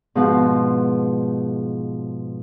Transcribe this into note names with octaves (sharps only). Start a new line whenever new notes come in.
G#2 B2 F3